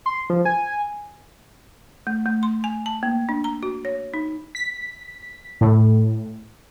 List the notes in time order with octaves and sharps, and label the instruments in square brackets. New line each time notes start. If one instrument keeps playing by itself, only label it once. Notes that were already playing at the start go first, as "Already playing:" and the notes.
[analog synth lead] C6
F3
G#5
[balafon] A3
A3
C6
G#5
A5
A#3
D4
A#5
F#4
C#5
D#4
[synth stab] B6
A2